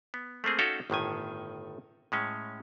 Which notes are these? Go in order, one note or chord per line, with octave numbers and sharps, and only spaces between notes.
B3
A3 A#3 C4 G#4
C#4 D#4 F#4 A4 F5 G5
G1 A2 D#3 G#5
A2 G#3 C#4